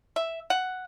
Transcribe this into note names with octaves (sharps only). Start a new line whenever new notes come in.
E5
F#5